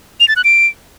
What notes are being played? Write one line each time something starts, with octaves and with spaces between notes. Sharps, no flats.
F7
A6
F#6
D7